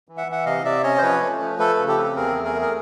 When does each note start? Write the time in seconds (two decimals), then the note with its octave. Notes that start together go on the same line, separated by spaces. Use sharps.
0.09 E3
0.17 E5 F#5
0.27 E3
0.32 E5 F#5
0.46 C3 D#5 F5
0.65 C3 D5 E5
0.83 C#4 C#5 D#5
0.98 C5
1.02 F3 B4 C#5
1.21 A3
1.40 F3
1.59 A3 A4 B4
1.79 C#3
1.88 G4 A4
1.97 C4
2.16 E2 G#4 A#4
2.35 A3
2.45 G#4 A#4
2.54 A3
2.62 A#4